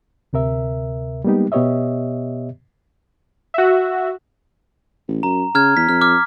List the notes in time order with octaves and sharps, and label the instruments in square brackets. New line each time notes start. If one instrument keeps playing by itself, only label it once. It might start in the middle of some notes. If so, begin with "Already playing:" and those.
[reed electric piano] D2 C3 A#4 E5
G3 G#3 A#3 B3 D#4 G4
B2 B3 G4 C#5 D#5 E5
[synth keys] F#4 E5
[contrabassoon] A1
[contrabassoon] F#2 [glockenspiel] A#5
[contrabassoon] C#3 [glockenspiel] A#5 F6 G#6
[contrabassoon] E2 [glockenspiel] B6
[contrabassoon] F2 [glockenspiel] F6
[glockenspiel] D6 F6